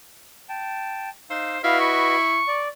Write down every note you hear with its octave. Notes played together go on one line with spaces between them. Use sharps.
G5 A5
D#4 C5 F5 E6
E4 F#4 B4 D#5 F5
C#6
D5